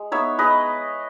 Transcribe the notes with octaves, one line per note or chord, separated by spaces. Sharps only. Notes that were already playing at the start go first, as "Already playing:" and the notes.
Already playing: G#3
B3 D#4 C#5 E5
G#3 B4 D#5